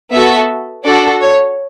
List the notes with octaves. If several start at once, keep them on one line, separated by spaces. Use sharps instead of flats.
B3 F#4 A4 E5
D4 F#4 A4 D5
C#5